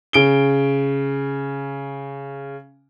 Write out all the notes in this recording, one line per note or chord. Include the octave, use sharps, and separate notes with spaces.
C#3 D7 G7